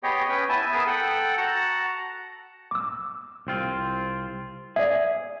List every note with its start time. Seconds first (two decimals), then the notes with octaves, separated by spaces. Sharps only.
0.03 B3 G4 G#4 C#5 D#5 G5
0.29 C#4 B4 G5
0.49 B3 E4 G#5 A5
0.73 B3 G#4 A#4 B4 E6
0.87 A4 F#5 G5
1.38 F#4 F#5 A5 A#5
2.71 D6 E6
3.47 C2 C4 F4
4.76 G#4 D5 E5